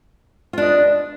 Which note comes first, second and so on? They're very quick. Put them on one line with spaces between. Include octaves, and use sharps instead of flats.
F4 D4 D#5 B4